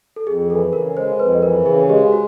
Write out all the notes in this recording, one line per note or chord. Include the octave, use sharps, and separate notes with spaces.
A4
F2 G#4
E3 A4
C#3 A#4
G#3 C5
F2 B4
E3 A#4
C#3 G#4
G#3 G4
F#4